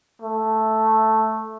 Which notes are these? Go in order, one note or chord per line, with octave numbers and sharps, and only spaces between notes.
A3